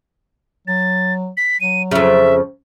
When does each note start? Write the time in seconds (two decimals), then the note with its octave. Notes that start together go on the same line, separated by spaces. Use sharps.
0.67 F#3 A6
1.37 B6
1.61 F#3 D#7
1.91 F2 C#3 E5